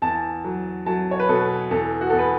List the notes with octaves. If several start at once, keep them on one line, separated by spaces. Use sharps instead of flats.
E2 A5
F#3
F#3 A5
C#5
B4
B2 A4
E2 A4
F#4
E2 A4
B4